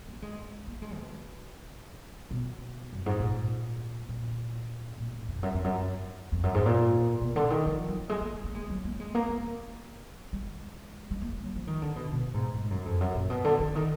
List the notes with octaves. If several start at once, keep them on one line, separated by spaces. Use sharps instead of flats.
A#3
G#3
A#3
G#3
B2
B2
F#2
G#2
A#2
A#2
A#2
G#2
F2
F#2
F2
F#2
F2
F#2
G#2
A#2
B2
D3
D#3
F3
F#3
G#3
A#3
A#3
G#3
F#3
A#3
G#3
A#3
A#3
A#3
G#3
G#3
A#3
F#3
F3
D#3
D3
B2
B2
G#2
G#2
F#2
F2
F#2
A#2
B2
D3
D3
D#3